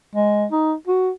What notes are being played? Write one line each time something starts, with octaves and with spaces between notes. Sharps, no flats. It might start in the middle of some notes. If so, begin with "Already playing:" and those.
G#3
D#4
F#4